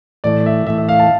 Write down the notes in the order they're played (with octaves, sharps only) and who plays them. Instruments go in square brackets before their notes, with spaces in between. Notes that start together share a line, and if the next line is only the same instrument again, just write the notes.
[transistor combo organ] A2 E3 A3 [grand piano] D5
[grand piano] E5
[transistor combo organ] A2 E3 A3 [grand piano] E5
[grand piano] E5
F5
A5